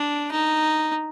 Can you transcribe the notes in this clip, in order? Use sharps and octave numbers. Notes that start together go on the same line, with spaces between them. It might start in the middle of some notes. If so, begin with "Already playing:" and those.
Already playing: D4
D#4